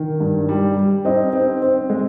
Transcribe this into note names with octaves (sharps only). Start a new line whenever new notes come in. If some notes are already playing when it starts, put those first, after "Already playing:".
Already playing: D#3
G2
G3
G3
C4 D#4 D#5
C4
C4
G#3